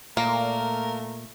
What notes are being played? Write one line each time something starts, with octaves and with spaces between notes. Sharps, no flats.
A#2 A3 A#3 A#4